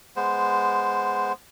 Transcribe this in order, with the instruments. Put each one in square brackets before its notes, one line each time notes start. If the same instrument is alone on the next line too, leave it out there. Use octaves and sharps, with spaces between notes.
[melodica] G#3 B3 C5